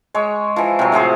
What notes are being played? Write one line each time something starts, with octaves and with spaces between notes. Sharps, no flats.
G#3 C#5
E3 F3
C3 F#3
A2 F3 G#4 C5